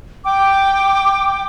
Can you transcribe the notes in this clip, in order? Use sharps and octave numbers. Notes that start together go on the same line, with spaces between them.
G5 D6